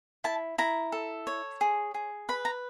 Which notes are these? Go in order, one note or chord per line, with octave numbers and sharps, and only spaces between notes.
E4 A5
E4 A#5
A4
C#5
G#4
G#4
B4 B5
A#5